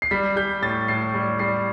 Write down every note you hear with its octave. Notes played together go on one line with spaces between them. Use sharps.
C7
G3 B6
G3 G6
A2 A6
A2 C7
G3
G3 C7